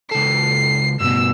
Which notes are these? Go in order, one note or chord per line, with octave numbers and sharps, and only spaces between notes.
C#2 A4 C7
G2 B2 E6